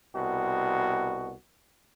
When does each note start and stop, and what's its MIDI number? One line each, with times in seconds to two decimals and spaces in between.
0.13 1.33 36
0.13 1.33 47
0.13 1.33 66